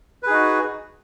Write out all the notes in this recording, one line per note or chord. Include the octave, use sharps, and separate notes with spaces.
D#4 F#4 G#4 B4